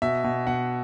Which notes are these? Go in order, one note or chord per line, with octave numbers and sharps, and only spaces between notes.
B2 E5
B2
B2 F#5